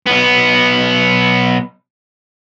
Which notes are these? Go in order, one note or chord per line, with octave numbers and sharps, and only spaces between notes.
B1 B3